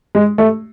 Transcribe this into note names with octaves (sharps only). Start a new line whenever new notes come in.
G#3
A3